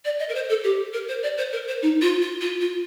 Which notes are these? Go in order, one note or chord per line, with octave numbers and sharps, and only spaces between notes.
D5
D#5
A#4
C5
A4
G4
A#4
C5
D5
C5
A#4
C5
D#4
F4
F4
F4
F4